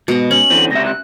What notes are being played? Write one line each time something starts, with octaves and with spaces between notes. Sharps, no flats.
G#2 B2 D#5
C#4 F#7
D3 E3 C4
C#2 C3 E5 A#6
F#6